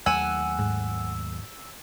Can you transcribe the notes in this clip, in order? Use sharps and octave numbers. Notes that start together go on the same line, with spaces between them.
D#2 F#3 A3 F#5 G#5 E6
G#2